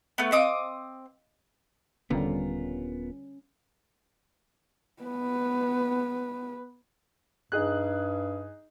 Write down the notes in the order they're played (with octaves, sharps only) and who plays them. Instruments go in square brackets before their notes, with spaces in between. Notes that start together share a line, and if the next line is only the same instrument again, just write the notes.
[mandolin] A3 B3
[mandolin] C4 D6 D#6 [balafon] D#5 F5
[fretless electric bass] D#1 [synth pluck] D3 G3 [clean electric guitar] B3 F4 A#4 [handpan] C#4
[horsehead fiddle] B3 B4
[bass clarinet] G2 [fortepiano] D#4 G#4 F#6